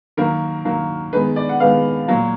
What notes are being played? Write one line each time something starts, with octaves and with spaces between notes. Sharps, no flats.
D#3 F#3 A#3 A#4
D#3 F#3 A#3
D#3 G#3 B3 B4
D5
F#5
D#3 G#3 B3 F5
A#2 F#3 A#3